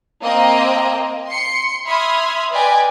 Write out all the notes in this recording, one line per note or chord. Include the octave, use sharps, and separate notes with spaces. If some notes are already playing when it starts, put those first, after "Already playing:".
A#3 C4 D#5 G5
C6 C7 C#7
E5 B5 C6 D#6 F6 G#6
B4 D5 D#5 G5 G#5